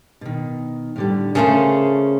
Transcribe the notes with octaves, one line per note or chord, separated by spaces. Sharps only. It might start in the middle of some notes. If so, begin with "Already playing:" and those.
B2 D#3
A2 D3 G3
C#3 A3 A#4 C5 G#5 A5